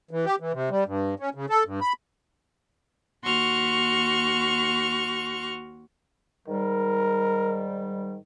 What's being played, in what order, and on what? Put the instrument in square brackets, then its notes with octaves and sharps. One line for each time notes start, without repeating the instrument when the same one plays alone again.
[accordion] E3
G4
E3
C3
G3
G2
C#4
C#3
A4
G2
B5
[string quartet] D#2 F#4 C6 C#6 F6
[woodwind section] G#2 D#3 G3 [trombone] A#4